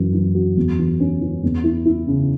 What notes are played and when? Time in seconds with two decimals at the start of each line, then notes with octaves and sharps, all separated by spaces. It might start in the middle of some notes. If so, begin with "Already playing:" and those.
Already playing: F#2 E3 F#3
0.14 E3
0.35 F#4
0.57 E2
0.79 E3
1.00 C#4
1.21 E3
1.43 E2
1.64 E4
1.85 E4
2.07 C#3